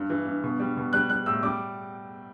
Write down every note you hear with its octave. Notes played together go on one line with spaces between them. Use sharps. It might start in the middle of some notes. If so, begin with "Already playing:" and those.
Already playing: G2
E3
G2
B2
G3
B2
G3 F#6
G3 F#6
A2 E6
G3 D6